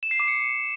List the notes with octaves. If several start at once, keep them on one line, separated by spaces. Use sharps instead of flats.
E7
C7
D6
C#7